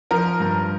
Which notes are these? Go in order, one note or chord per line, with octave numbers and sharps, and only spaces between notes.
F3 A#4
G2